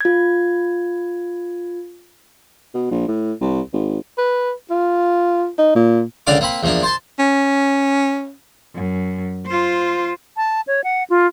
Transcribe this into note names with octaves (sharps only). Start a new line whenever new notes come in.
F4 G#6
B2
A#1
A2
C2
G#1
B4
F4
D#4
A#2
C#2 D3 A#4 D5 F5 D6
A#3 C4 B5
E2 F3 A#3 D4
C5 A5 C6
C#4
F#2
F4 C5
A5
C#5
F#5
F4